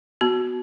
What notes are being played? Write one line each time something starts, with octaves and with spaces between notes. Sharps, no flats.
B3 F#4